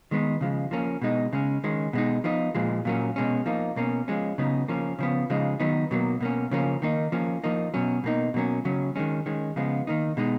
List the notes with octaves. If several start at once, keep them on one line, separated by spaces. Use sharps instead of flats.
D#3 G#3 B3 D#4
C#3 F3 G#3
F3 A#3 C#4
B2 G#3 D#4
C#3 G#3 C#4
D#3 G#3 C#4
B2 G#3 D#4
F3 B3 D#4
A#2 F3 G#3
A#2 F#3 A#3 C#4
B2 G#3 C#4
F3 A#3 D#4
B2 A#3 C#4
F3 G#3 C#4
C#3 F#3 B3 D#4
C#3 F3 A#3 C#4
C#3 F3 B3
C#3 F3 G#3 D#4
D#3 F#3 B3 D#4
B2 F#3 A#3
B2 A#3 C#4
C#3 F3 A#3 C#4
D#3 A#3 D#4
F3 A#3 C#4
F3 A#3 D#4
B2 F#3 C#4
B2 A#3 D#4
B2 F#3 A#3 C#4
C#3 F#3 C#4
D#3 G#3 C#4
D#3 G#3 C#4
C#3 F3 G#3 B3
D#3 A#3 D#4
B2 G#3 D#4